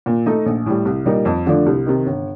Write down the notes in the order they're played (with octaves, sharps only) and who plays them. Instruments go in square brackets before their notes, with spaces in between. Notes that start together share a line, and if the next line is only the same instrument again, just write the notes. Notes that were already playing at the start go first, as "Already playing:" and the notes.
[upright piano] A#2
A3 D#4 A4 D#5
A#1
A2 G3
C2
A#2 G3 A#3 D#4
F2
D3 F3 A3 D4
C2
C3 D#3
G1